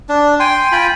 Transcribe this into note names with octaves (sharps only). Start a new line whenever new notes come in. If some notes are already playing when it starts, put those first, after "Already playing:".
D4
G5 G#5 C6
F4 G5 G#5 B5